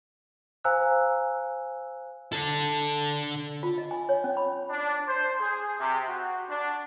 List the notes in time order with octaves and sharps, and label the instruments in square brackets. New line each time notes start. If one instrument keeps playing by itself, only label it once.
[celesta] C5 F5 G#5 A#5 E6 F#6
[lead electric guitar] D3 A4
[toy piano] F4
D#5
G#5
C#5
C#4
B5
[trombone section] D4
C5
G#4
C3
F#4
D4